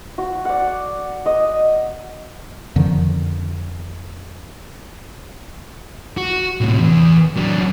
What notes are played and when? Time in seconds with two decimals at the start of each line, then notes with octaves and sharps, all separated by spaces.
0.18 F#4
0.45 D5 F#5
1.26 D#5
2.76 F2 D3 D#3 F3
6.17 F#4
6.61 A2 C3
6.79 E2
7.37 F#3 D4